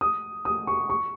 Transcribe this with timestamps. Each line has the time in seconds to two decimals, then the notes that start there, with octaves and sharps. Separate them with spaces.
0.01 D#6
0.45 D#6
0.67 C#6
0.90 C#6